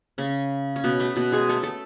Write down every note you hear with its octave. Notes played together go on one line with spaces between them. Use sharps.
C#3 C#4
C#4
B2 B3
A3
B2 B3
G#3 G#4
A3 A4
A4